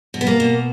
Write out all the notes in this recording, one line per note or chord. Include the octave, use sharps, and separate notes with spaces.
B2
B3
A#3
B2